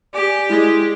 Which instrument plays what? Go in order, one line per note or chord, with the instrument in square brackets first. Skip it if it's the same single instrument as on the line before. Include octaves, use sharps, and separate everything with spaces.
[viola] G4 [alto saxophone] D5 [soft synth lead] G#5
[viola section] G#3 [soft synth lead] E4